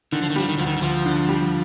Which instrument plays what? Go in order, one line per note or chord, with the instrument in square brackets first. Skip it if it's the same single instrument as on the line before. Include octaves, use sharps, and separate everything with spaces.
[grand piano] D3 [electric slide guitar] D#3
[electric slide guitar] F3
D#3
[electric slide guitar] F3 [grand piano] G3
[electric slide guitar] D#3
[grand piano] D2 [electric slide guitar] F3
[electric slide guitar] D#3
D#3
[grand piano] D2 [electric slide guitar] F3
[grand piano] D3
G3